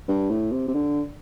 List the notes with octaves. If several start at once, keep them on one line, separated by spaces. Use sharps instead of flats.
G2
A2
C3
C3
D3